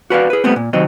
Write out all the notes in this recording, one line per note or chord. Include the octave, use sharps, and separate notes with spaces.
F#4 B4 D5 F5
G#4 B4
G3 A3 B3 C4
A#2
C3 D#3 F#3 C4 D#5